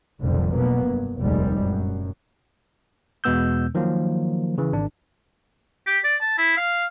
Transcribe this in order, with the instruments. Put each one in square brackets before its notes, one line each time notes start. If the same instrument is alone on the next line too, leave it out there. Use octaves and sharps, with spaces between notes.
[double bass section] F1 B1 F2 A#2 D3 G3
B2 F#3 A#3 B3
G2
F1 A#1 D#2 G3 G#3
F#2
[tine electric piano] E2 B2 G#3 B3 E6 G6
D#3 F3 F#3 A#3
C#3 E3
G#1 D4
[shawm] G4
D5
A5
E4
F5